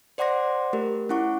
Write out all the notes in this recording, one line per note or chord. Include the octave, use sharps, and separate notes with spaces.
C5 D5 F#5 C6 D6 A#6
A3 G4 A#4
C#4 E4 F#5 C#6 D6